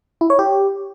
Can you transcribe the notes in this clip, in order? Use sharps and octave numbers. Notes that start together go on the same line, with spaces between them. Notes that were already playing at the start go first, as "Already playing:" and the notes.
E4
C#5
G4